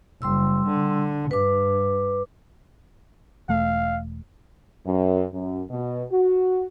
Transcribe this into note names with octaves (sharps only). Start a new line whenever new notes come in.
F#1 G3 C6 E6
D3
G2 B4 D6
E1 A3 F5
F#2
F#2
B2
F#4